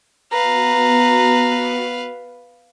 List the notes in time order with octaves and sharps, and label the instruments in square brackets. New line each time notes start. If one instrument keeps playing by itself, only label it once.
[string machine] B3 F#4 [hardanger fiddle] B4 F5 [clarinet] A#5